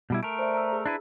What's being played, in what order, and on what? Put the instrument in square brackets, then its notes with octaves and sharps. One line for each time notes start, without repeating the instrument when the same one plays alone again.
[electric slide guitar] B2 G3 E4
[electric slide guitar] A3 A#4 [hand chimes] D7
[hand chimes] C5 D5 E5
A#5 E6
G#4
[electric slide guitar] D4 E4 B4